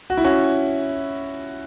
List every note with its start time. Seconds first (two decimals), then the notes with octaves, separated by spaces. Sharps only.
0.10 F#4
0.17 E4
0.24 C#4 F#4